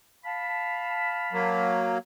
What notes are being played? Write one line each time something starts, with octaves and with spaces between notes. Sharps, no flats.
F5 A5 B5
F#3 A#3